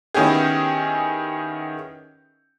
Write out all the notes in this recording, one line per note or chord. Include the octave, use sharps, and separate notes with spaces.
D#3 B3 C#4 E4 G4 G#4